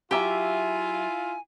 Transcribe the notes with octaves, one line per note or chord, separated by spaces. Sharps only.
F#3 E4 F4 G4 E5 G#5 A#5